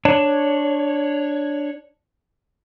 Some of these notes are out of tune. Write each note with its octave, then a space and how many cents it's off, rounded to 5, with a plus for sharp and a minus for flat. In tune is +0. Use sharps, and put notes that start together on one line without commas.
D4 +0 C#5 +0